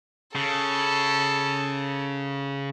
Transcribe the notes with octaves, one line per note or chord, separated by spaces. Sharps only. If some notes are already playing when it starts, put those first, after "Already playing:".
C#3 A4